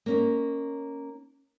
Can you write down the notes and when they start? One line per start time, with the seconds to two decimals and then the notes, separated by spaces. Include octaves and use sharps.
0.06 A#3 C#4 D#4